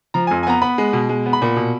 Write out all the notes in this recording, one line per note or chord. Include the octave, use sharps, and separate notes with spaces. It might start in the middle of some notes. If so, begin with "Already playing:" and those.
F3 A#5
G#5
F2
G#5
B3 A#5
B3 B5
G#3
B2
G#3
B3
B5
A#2
B2